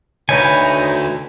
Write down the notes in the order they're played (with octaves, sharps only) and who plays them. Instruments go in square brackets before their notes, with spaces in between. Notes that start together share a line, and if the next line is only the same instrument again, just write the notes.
[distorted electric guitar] D2 [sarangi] D#4 [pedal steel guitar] B4 G#5 [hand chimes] C#5 G6 C#7